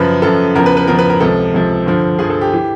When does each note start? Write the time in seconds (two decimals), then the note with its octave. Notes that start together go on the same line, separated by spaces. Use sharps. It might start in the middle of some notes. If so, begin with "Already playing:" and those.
Already playing: F#2 C#3 F3 B4
0.22 F#2 C#3 F3 A4
0.55 E2 C#3 F3 A#4
0.66 B4
0.77 B4
0.87 E2 C#3 F3 A#4
0.99 B4
1.10 A#4
1.20 C#2 C3 F3 A4
1.53 C#2 C3 F3
1.86 G2 D3 F3
2.18 G2 D3 F3 G#4
2.30 A4
2.41 G4
2.53 E3